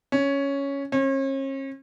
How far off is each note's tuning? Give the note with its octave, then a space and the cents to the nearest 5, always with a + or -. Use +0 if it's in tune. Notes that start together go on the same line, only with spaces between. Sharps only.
C#4 +5
C#4 -40